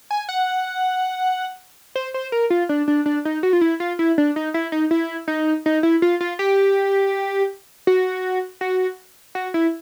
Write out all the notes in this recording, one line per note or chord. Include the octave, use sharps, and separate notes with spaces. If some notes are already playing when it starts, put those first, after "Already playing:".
G#5
F#5
C5
C5
A#4
F4
D4
D4
D4
D#4
F#4
F4
E4
F4
E4
D4
D#4
E4
D#4
E4
D#4
D#4
E4
F4
F4
G4
F#4
F#4
F#4
E4